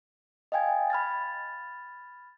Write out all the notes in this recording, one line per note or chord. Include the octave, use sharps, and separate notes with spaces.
D#5 F5 G5 G#5 G#6
B5 F6 G#6 A6